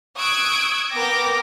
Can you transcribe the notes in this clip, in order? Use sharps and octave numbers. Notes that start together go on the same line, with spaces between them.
C#6 D#6 E6 F#6 G#6 D7
B3 A#4 G5 D6 A#6